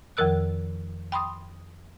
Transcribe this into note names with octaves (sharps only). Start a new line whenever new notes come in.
F2 D#3 F3 A#4 E6 F#6
G5 B5 C6 D#6